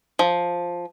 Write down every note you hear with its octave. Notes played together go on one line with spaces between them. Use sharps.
F3